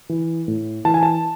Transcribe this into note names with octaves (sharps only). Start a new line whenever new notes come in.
E3
A2
E3 A5
G#5
A5